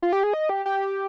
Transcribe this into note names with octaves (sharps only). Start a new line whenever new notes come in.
F4
G4
G#4
D#5
G4
G4